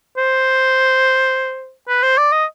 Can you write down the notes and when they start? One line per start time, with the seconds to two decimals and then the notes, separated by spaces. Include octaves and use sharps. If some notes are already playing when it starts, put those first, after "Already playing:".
0.17 C5
1.88 B4
2.03 C5
2.18 D5
2.32 D#5